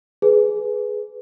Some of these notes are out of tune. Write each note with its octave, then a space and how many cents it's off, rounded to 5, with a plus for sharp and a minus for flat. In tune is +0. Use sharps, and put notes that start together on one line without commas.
G#4 +15 B4 +0